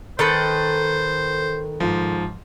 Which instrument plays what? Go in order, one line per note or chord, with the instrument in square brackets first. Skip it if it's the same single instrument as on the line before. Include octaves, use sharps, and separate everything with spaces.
[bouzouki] D#3 A4 B4 [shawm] C5
[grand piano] G#2 F3